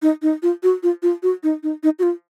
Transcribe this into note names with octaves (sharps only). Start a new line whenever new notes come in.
D#4
D#4
F4
F#4
F4
F4
F#4
D#4
D#4
D#4
F#4
F4